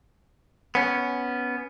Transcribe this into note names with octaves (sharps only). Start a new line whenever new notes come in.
B3 C#4